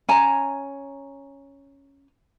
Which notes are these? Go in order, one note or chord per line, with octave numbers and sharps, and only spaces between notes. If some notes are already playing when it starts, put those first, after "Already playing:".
C#4 G#5 A#5